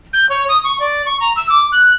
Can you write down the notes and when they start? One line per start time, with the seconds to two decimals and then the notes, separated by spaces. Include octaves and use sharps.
0.13 G6
0.29 C#5
0.49 D#6
0.64 C#6
0.80 D5
1.06 C#6
1.21 A#5
1.36 E6
1.50 D6
1.72 F#6